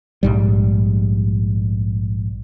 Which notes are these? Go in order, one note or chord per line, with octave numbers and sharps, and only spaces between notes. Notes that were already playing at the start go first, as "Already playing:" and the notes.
A#1 G#2 G3